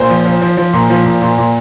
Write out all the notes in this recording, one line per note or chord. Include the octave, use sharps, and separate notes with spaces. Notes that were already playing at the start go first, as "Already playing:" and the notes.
Already playing: A#2 C5
F3
F3
F3
F3
A#2
F3
A#2
A#2
A#2